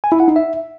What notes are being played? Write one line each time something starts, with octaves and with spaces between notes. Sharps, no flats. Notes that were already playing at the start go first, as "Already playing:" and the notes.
G#5
E4
F#5
D#4
E5